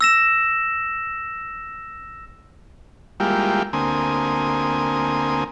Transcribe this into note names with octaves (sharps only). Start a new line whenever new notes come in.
E6 A#6 E7
G3 G#3 A#3 E4 F4 G4
D2 A#3 C4 G#5 D#6